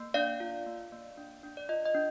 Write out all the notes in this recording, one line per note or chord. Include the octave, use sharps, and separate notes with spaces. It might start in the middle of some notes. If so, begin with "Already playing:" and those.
Already playing: A#3
D4 D5 F5
F4
A#3
A#3
D4
D4
D5
F4 D#5
D#5
D4